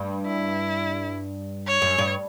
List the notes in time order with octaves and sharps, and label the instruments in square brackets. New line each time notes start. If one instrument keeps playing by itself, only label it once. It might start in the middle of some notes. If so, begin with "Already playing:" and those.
Already playing: [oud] G2
[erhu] E4
C#5
[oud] F#2
G2